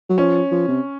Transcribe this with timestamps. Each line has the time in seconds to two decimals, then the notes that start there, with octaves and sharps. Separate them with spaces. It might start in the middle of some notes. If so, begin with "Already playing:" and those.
0.09 F#3
0.18 F3 C#4
0.52 F3
0.68 C3